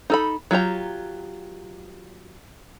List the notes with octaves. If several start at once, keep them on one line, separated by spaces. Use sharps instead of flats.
D#4 A4 B5
F#3 F4 G4 A#5